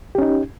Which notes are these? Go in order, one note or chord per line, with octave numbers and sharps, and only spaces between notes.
C#4 D#4 G4